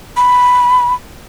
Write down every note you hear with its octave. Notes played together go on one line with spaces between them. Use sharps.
B5